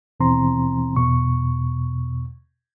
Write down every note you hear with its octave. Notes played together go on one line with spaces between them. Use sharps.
D#2 B2 E3 C4 A#5 C6
E2 B2 C#6